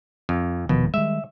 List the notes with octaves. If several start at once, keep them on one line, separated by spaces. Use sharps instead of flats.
F2
D#1 B2 D#3 F3
D#3 G3 G#3 E5